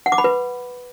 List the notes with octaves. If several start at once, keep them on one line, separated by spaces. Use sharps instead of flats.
F#5
D6
B5
B4